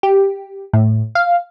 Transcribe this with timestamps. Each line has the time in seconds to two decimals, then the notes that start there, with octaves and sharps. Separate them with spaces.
0.03 G4
0.73 A2
1.15 F5